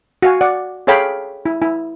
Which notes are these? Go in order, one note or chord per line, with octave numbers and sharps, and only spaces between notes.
F#4 F5 G#5
D5 F#5
G#4 A4 C#5 F5 G5 B5
E4
E4